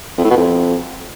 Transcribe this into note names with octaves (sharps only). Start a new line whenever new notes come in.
F2
A2
B2
F2